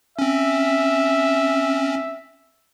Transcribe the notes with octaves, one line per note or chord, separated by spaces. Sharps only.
C4 C#4 E5